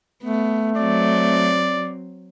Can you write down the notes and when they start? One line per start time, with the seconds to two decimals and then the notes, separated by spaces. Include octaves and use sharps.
0.23 A3 B3
0.78 F#3 C4 D5